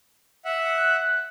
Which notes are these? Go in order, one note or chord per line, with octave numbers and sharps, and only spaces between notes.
E5 F#5
F#6